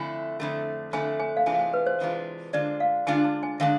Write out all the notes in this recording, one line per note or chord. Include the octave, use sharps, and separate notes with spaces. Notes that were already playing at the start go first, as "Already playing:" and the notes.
Already playing: F2 D3 A3 E4 G#5
F2 D3 A3
F2 D3 A3 G#5
G#5
F5
C3 E3 G#3 D4 F4 G#5
F5
G#5
B4
C5
C3 E3 G#3 D4 F4
D3 G#3 D4 F4 D5
F5
D3 G#3 D4 F4 G#5
A5
G#5
D3 G#3 D4 F5